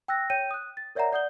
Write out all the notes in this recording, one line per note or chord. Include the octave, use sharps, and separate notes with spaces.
G5 E6 F#6 A#6
C#5 G5 G6 D#7
D#6 F#6
A6
A#4 C#5 D5 E5 F#5 A#5
D5 F#5 D#6 G6 G7